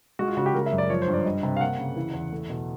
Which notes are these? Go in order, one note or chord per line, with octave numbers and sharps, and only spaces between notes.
G#3 F#4
F4
C#3 F#4
G4
G#3 A#4
E5
F#2
D5
F3 C#5
C5
G2
D5
G3 D#5
C3
F5
A#3 F#5
C#3
E3
E2
A3
B2